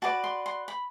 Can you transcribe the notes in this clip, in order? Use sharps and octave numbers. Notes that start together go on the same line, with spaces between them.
F#4 B4 D5 A5
C6
C6
B5